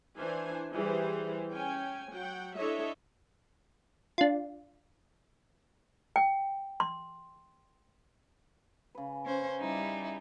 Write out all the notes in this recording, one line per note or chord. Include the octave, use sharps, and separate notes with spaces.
E3 D4 C5 G#5
E3 G3 G#4 C5
C#4 G5 G#5
F#3 F#5 G5
D4 E4 A4 C#5 D#5 E5
D4 F4
G5
C6
C#3 B4
C#4 C5
G3 D#4 E4